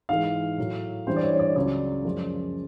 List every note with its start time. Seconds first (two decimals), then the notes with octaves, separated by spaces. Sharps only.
0.09 G#2 E3 G#3 F5
0.58 A2 F#3
1.07 G2 E3 G3 C5
1.16 D5
1.23 C#5
1.34 C#5
1.39 D5
1.56 C#2 C#3 F#3 D5
2.05 F#2 C#3 F3 G#3